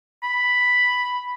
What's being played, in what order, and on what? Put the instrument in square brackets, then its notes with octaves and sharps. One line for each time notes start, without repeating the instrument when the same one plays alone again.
[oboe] B5